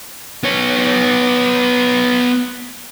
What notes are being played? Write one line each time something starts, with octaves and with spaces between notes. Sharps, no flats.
B3 C#5